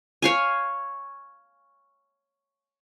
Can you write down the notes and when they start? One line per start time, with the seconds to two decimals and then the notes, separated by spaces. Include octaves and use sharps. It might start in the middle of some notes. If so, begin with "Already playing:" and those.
0.22 C#5 F5 G#5